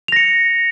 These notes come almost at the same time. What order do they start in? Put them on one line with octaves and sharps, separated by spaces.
F7 A#6 C#7